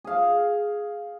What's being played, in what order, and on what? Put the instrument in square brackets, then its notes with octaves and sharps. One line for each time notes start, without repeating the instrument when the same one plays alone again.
[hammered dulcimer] G#4 F5